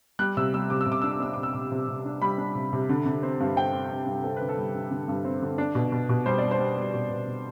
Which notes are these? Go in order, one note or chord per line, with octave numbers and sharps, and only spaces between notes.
G3 F#6
C3 E6
G3 E6
C3 D6
E6
C3
D6
D4 E6
D6
D4 E6
C3 D6
E6
C3 D6
C3
C3
D4
G3 B5
D4
C3
C3
D3
D3
C4
G2
C4 G5
C4
G2
G2
C4 A4
D3 B4
A4
G3
D3
D3
G2
C4
D3
D4
B2
B2
B2
G3 C5
G3 D5
C5
G3
G3
B2
B2
B2